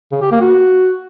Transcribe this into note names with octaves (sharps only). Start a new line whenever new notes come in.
C#3
G4
A#3
F#4